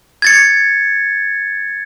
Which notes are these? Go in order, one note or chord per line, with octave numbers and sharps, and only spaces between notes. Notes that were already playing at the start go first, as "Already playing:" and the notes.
G#6 A6 C#7